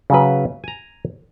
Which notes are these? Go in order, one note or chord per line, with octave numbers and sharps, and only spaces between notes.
C#3 F#3 B4
G#5 A#5